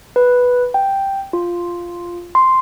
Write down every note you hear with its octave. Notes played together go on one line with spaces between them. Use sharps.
B4
G5
F4
C6